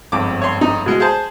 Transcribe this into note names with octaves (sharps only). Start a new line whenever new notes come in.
G1 F2 G#2 D6
C#5 C6
D#4
B2 G#3 G#6
G#4 C5 A5